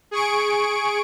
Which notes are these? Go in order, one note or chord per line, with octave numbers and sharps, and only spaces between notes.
G#4 C#6 D7